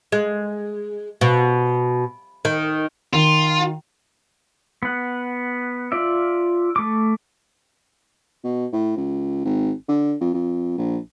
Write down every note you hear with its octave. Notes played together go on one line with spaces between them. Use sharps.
G#3
B2
D#3
D#3 F4
B3 F#5
F4 D5 E5
A3 D6
B2
A2
C#2
G#1
D3
F2
F2
A#1